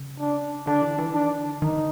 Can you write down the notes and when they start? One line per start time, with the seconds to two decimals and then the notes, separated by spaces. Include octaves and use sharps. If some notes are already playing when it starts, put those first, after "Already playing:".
Already playing: C#3
0.20 D4
0.67 D3 D4
0.82 E3
0.98 E3
1.14 D#3 D4
1.37 D3
1.61 D#3 D#4